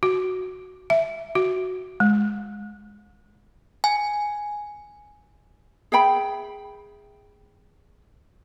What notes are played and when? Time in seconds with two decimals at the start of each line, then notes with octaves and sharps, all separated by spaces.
0.03 F#4
0.90 E5
1.35 F#4
2.00 G#3
3.84 G#5
5.92 G#4 E5 G5 B5